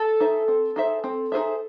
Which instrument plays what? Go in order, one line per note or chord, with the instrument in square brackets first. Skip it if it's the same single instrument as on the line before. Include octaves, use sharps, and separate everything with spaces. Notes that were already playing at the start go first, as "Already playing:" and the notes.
Already playing: [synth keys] A4
[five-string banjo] D#4 G#4 C5 E5
C4
D#4 G#4 C5 E5
C4
D#4 G#4 C5 E5